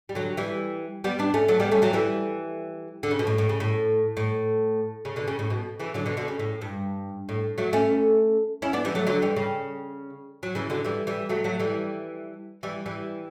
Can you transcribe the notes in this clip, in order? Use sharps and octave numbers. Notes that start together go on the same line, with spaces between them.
G3
D3 F#3
E3 G3
G3 B3
B3 D4
A3 C#4
F#3 A3
G3 B3
A3 C#4
F#3 A3
E3 G3
D3
C#3
B2
A2
A2
C#3
A2
A2
C#3
B2 D3
C#3
A2
B2
C#3 E3
D3 F#3
B2 D3
B2 D3
C#3
A2
G2
A2
F#3 A3
A3 C#4
C#4 E4
B3 D4
E3 G3
F#3 A3
D3 F#3
E3 G3
C#3
F#3
C#3 E3
D3 F#3
E3 G3
E3 G3
F#3 A3
F#3 A3
E3 G3
E3 G3
E3 G3